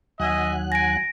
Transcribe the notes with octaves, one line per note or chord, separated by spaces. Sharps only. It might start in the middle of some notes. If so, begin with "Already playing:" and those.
D#2 F#3 D#5 E5 G#5 F#6
G#5 A#6 D7